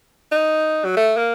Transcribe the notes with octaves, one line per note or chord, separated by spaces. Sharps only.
D#4
F#3
A3
A#3